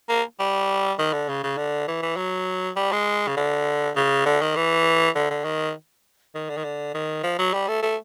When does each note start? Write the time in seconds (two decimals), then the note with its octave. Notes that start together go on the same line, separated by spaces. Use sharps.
0.09 A#3
0.39 G3
0.99 D#3
1.13 D3
1.29 C#3
1.43 C#3
1.57 D3
1.87 E3
2.02 E3
2.17 F#3
2.76 G3
2.92 G#3
3.27 C#3
3.37 D3
3.96 C#3
4.25 D3
4.41 D#3
4.56 E3
5.15 D3
5.30 D3
5.44 D#3
6.35 D#3
6.49 D3
6.57 D#3
6.64 D3
6.94 D#3
7.23 F3
7.39 F#3
7.53 G3
7.68 A3
7.83 A3